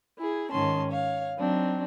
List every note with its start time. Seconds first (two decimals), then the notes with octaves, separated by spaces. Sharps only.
0.17 E4 G#4
0.50 G#2 D#3 C#4 A5 C6
0.90 C#5 F5
1.37 F#3 C4 D4 D#4